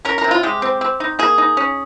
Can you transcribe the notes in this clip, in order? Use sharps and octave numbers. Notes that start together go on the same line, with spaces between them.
C#4 A#4
A#4
C3
F4
G#3 G4
C4
C4
D#4
A#3 G#4
D#4
C#4